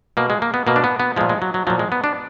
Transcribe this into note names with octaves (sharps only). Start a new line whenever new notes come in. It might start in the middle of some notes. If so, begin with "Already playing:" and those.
B2 A#3
G#3
A#3
B3
B2 A#3
D4
B3
B3
A#2 F3 G#3
G#3
F#3
F#3
A#2 F3 F#3
G#3
B3
D4